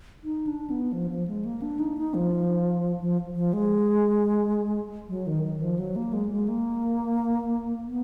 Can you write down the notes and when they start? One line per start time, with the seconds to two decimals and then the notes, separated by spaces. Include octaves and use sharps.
0.24 D#4
0.47 D4
0.70 B3
0.93 F3
1.11 F3
1.28 G#3
1.45 A#3
1.62 D4
1.80 D#4
1.97 D#4
2.14 F3
3.01 F3
3.36 F3
3.53 G#3
5.09 F#3
5.27 D#3
5.44 D#3
5.62 F3
5.79 F#3
5.96 A#3
6.13 G#3
6.31 G#3
6.48 A#3
7.88 B3